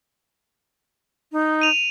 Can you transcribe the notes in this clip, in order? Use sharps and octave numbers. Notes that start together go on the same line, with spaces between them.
D#4
D#7 F7